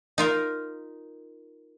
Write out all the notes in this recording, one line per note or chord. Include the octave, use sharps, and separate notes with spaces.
D#4 F4 A#4